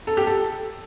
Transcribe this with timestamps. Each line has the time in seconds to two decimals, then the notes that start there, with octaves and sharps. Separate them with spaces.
0.07 A4
0.17 G4
0.27 A4